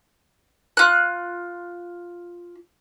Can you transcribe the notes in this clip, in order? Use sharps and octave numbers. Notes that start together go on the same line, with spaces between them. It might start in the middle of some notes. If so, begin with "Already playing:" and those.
F4 F#6